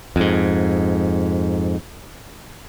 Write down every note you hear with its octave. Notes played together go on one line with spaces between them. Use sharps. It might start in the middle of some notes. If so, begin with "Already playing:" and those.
F2 G#2